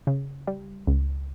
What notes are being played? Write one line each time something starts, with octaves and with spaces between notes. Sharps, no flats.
C#3
G3
C#2